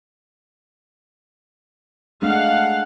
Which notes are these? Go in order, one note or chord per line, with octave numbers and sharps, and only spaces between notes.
G#3 A3 D4 F5 F#5